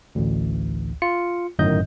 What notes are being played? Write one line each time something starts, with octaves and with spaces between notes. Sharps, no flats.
A1 D2
F4 C#7
G1 F#2 A2 D#3 D#5 G6